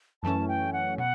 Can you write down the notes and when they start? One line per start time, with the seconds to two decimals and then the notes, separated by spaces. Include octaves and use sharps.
0.23 F#2 E3 A3 C#4 A5
0.48 G5
0.73 F#5
0.98 B2 F#5